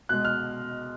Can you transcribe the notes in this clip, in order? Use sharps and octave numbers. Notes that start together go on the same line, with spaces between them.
B2 G#3 F#6
F6